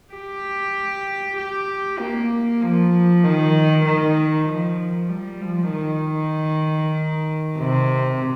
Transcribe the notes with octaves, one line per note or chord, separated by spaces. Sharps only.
G4
G4
A#3
F3
D#3
D#3
F3
G3
F3
D#3
C3